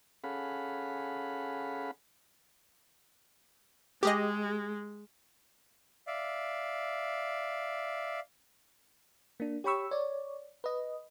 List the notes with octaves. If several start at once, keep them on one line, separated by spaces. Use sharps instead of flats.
C#4 G#4 A4 F5 F#5 B5
G#3 G4 G#4 D#5
D5 E5 F5
A#3 D4
G4 C#5 G5 B5 C#6 E6
C#5 D5
B4 D#5